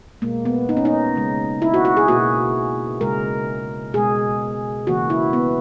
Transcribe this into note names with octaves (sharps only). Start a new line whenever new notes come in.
B2 G#3 A#3
B3
D#4
C#4
D#4
C#3 G#3
E4
F#4
F#4
G#4
B2 A#3 F#4
C#3 G#3 A#4
B2 G#3 G#4
C#3 E3 A#3 F#4
E4
B3